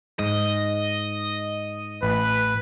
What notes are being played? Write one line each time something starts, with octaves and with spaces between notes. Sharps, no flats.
G#2 D#5
A1 B4